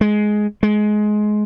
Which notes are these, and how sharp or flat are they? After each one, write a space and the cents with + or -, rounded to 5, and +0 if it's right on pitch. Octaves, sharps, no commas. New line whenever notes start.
G#3 +10
G#3 +20